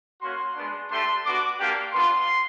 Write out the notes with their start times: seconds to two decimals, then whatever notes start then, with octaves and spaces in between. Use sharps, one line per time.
0.22 A#3 C#4 F#4 C6
0.56 G#3 B3 D4
0.90 A3 D4 G4 C6
1.25 B3 D4 F#4 D6
1.59 A#3 D4 G4
1.93 B3 D4 F4 C6